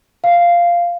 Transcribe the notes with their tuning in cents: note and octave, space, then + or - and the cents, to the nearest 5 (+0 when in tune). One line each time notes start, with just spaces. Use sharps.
F5 -10